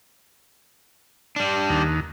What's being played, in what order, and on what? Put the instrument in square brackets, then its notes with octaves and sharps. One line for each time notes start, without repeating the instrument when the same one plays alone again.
[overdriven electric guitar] G3 D4
[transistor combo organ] D#2